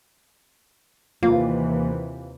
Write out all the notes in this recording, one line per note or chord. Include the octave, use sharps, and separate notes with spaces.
D#2 C3 E3 A#3 F4